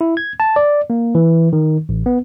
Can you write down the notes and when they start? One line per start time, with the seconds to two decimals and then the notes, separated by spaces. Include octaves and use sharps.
0.01 E4
0.17 G#6
0.40 A5
0.56 D5
0.90 A#3
1.15 E3
1.53 D#3
1.89 A1
2.06 B3